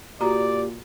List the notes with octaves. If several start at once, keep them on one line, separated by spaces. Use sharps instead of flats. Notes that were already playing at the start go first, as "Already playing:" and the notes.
A#2 F#4 G4 D5 A#5